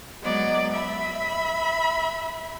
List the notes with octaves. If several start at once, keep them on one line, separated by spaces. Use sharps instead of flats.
F#3 G#3 B3 D5 D#5
E5 B5